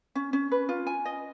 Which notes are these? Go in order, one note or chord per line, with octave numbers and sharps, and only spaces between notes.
C#4
C#4
B4
F4
G#5
D#5